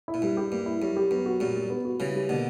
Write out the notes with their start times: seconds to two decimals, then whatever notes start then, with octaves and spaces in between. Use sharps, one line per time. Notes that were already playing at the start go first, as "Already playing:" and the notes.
0.08 E4
0.14 A#2
0.22 G2 G3
0.37 G4
0.52 G2 A#3
0.66 E4
0.81 F#2 G3
0.96 G4
1.11 F#2 B3
1.26 F#4
1.40 F#2 A#2 G3
1.55 G3
1.70 B3
1.85 F#4
2.00 C#3 E3 G3
2.15 G3
2.29 B2 D3 A#3